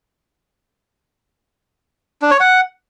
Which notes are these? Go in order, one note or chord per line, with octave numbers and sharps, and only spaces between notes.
D4
C#5
F#5